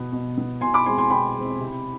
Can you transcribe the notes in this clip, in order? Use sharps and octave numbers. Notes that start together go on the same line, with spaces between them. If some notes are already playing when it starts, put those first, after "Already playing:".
Already playing: B2 B3
B2
B3
B2 G#5 C6
B5 D6
G#3 C4 G#5 C6
G#5 C6
B2 G5 B5
G#3 C4
C3